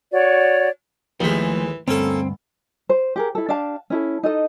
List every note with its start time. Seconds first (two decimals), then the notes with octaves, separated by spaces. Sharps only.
0.12 F#4 C#5 D5
1.20 D#2 E3 F3 G#3 A3
1.88 D2 G2 A#3 C4 C#4 A4
2.89 C5
3.16 G4 G#4 A#4
3.35 E4 A4
3.49 D4 G4 F5 A5
3.90 C#4 E4 A4
4.23 D#4 A4 D#5